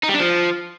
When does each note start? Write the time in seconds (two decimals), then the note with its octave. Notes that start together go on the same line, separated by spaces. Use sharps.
0.03 D#4
0.09 G3
0.14 D4
0.20 F3